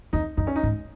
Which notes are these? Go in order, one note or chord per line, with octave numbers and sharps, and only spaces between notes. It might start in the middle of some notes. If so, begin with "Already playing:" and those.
F2 D#4
F#2 D#4
C#4
D#4
G#2